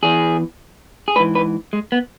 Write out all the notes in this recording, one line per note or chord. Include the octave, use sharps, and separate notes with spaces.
E2 E3 G#4
G#4
G#2 E3 B4
B4
G#3
B3